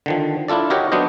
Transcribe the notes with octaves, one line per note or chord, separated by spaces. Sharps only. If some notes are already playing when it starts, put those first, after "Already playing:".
D3 D#3 F3
D4 E4 F4 A4 D5
D#4 F#4 G4 A#4 C#5
F#3 B3 D4 C5 D#5